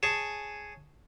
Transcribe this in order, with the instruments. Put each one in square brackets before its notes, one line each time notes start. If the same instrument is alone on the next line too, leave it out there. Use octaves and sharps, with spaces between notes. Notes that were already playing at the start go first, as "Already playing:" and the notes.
[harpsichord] G#4 C#5 G#5 A5